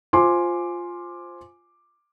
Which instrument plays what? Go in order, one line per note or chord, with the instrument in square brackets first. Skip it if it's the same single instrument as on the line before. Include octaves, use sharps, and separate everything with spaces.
[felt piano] F4 C5 G#5 C6 D6